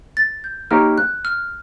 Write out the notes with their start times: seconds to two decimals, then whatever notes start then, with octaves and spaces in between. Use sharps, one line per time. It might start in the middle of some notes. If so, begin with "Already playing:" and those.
0.17 A6
0.44 G6
0.71 A#3 D#4 G4 A#4 C#5 F6
0.98 F#6
1.25 F6